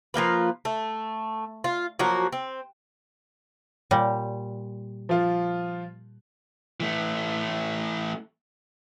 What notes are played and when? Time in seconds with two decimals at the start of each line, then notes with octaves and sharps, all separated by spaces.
0.14 F3 A#3 F4 B4
0.65 A3
1.64 F4
1.99 F3 F#3 A#3 F#4
2.32 C4
3.91 A#2 G3
5.09 F3 F4
6.80 E3 A3